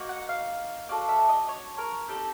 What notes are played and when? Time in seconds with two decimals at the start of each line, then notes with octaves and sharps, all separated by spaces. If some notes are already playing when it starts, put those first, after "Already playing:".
Already playing: A#3 D#4 F#4
0.09 F#5
0.29 F5
0.89 D4 F#4 A4 F5
1.09 E5
1.29 D#5
1.48 C#5
1.78 A#4
2.08 C4 D#4 G4 A4